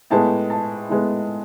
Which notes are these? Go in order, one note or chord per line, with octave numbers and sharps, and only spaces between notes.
A2 G#3 B3 A5
A5
A2 G#3 B3